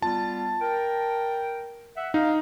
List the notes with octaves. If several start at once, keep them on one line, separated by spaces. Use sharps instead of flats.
G3 B3 F4 A5
A#4 G5
E5 F#5
D#4 F5